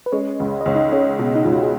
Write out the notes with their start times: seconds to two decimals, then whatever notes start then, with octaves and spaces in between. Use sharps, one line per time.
0.06 B4
0.12 G#3 C#4 C#5
0.40 C#2
0.61 D#5
0.66 C#2 C#5
0.75 D#4 D#5
0.92 G#3 C#4 C#5
1.19 B2
1.35 D#4
1.44 C#2 F4
1.53 F#4
1.62 G#4